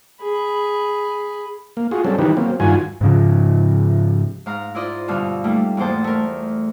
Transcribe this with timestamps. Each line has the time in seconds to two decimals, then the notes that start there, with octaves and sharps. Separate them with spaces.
0.22 G#4 B5
1.77 A#3
1.91 F4 F#4 G#4
2.05 F#3 G3 C4 C#4 A4
2.19 D#3 E3 F#3 D#4 G4 B4
2.37 F#3 A#3 C4
2.60 G2 D#3 F4 F#4 G#5
3.01 G#2 C#3 F3
4.46 G#2 F5 A#5
4.75 E4 F4 C5 D5 D#5
5.08 G2 B2 D3 F5 E6
5.44 G3 A3 A#3 D#4
5.77 E2 G#2 A#3 C5 A5
6.04 A3 A#4